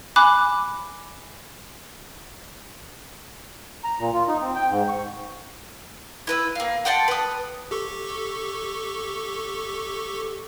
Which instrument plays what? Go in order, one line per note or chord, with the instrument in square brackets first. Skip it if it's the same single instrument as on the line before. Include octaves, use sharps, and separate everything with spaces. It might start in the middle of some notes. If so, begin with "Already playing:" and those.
[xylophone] G#5 B5 D6 F#6
[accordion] A#5
A#2
F4
D#4
C4
G5
G#2
C#6
[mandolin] E4 B4 E6
A#3 F5
F#5 G5 A5 C6
B4 D#6
[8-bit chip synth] G4 A4 C#6